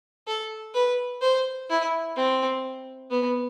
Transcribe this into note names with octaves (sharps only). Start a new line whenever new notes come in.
A4
B4
C5
E4
C4
B3